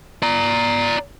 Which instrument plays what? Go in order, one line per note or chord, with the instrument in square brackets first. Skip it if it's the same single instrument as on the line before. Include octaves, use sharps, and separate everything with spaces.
[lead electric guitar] D5 A#5